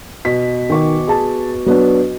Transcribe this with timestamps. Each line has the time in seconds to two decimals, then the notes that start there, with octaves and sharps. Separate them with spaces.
0.25 B2 B6
0.70 D#3 G#5 C#6 D6
1.07 G#4 A5
1.66 F#3 B3 D4